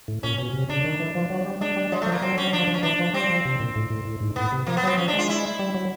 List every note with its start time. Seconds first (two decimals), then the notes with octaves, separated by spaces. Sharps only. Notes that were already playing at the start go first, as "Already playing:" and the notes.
0.08 A2
0.23 A#2 C#4
0.38 B2 C#4
0.53 C3
0.69 C#3 D4
0.84 D#3
1.00 E3
1.15 F3
1.30 F#3
1.45 G3
1.61 G#3 D4
1.76 G3
1.92 F#3 G#3
2.02 F3 A3
2.12 A#3
2.22 F#3 C4
2.37 F#3 C#4
2.53 F3 D4
2.67 F3
2.74 C#4
2.83 E3 D4
2.99 F3
3.13 G3 C4
3.30 F3
3.45 C3
3.60 A#2
3.75 A2
3.90 A2
4.05 A2
4.21 G#2
4.36 A2 B3
4.52 C3
4.67 F3 A#3
4.77 B3
4.83 F#3 C4
4.98 F3 C#4
5.08 D4
5.13 G#3
5.19 F4
5.29 E4
5.59 G3
5.74 F#3